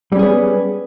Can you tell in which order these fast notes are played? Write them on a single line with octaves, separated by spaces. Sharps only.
G3 C#4 G#4 B3